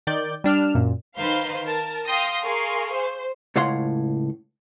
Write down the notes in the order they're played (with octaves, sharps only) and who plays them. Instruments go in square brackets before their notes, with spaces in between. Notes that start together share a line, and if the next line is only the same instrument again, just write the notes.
[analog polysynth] D#3 D5 G6
G3 D4 F6 E7
F#2 A#2
[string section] D#3 B4 C5 F5 C6
A#4 A5
F5 G5 C6 D#6 A#6
G#4 A#4 F5 C6 C#6
C5
[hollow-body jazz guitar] C#2 A2 C#5 F5 F#5 C6